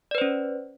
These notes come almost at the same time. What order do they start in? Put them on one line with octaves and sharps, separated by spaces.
D5 B4 C5 C#4